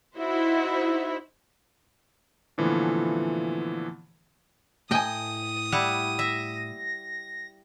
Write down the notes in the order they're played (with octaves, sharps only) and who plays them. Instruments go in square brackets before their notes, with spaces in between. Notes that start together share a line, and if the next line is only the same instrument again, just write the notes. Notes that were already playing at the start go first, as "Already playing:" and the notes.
[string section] D#4 E4 F#4 C5 E5
[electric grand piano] A#2 D3 E3 F3 A3 B3
[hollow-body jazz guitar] A2 G#5 [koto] D#5 G5 [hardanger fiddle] D#6
[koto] G3 E4 F#5
[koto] E5 [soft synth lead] A#6